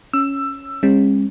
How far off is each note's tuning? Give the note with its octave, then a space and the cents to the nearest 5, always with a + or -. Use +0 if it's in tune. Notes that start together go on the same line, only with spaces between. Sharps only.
C#4 +0 E6 +15
G#3 -40 C#4 -40